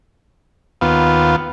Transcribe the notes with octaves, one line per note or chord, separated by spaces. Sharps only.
D#2 B3 F4